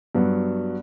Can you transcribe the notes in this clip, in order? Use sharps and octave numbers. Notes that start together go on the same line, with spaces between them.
G2 F#3 B3 F#4